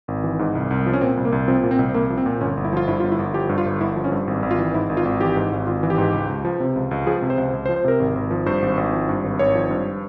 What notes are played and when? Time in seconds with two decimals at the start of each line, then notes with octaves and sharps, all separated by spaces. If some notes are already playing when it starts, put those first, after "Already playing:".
0.08 G#1
0.24 E3
0.39 G#2
0.55 C2
0.71 C2
0.86 F3
0.93 C#4
1.01 A#2 C4
1.17 C2
1.25 A#3
1.32 C2
1.48 F3 C4
1.64 A#2
1.71 C4
1.79 C2
1.94 C2 A#3
2.10 F3
2.18 C4
2.26 A#2
2.41 G1 C#4
2.57 G1
2.65 E4
2.73 F3 F4
2.88 G2 E4
3.00 G1 F4
3.12 E4
3.19 G1
3.34 F3 G4
3.49 G2
3.58 F4
3.65 G1
3.81 G1 E4
3.96 F3
4.04 C#4
4.12 G2
4.27 G#1
4.43 G#1
4.51 F4
4.59 E3
4.74 G#2 E4
4.90 G#1
4.97 F4
5.05 G#1
5.20 E3 G4
5.36 G#2
5.52 G#1
5.67 G#1 F4
5.83 E3
5.90 G4
5.98 G#2
6.14 C#2
6.29 C#2
6.45 F3
6.60 C3
6.76 C#2
6.91 C#2
7.07 F3 G#4
7.22 C3
7.30 C5
7.38 C#2
7.53 C#2
7.66 C5
7.69 F3
7.76 C5
7.84 C3 A#4
8.00 G#1
8.15 G#1
8.31 F3
8.46 G2 C5
8.62 G#1
8.77 G#1
8.93 F3
9.09 G2
9.24 G#1
9.39 G#1 C#5
9.55 F3
9.71 G2